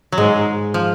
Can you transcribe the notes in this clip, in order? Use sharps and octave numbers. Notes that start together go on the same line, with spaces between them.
F#3
G#2 G#3
F3